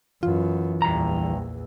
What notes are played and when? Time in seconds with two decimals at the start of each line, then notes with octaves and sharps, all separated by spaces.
0.23 F#2 E3 B3 F4
0.82 A#1 E2 G2 A#5